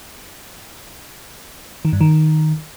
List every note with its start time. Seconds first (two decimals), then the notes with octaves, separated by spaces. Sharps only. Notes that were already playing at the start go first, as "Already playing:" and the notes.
1.85 D#3
1.93 G2
2.01 D#3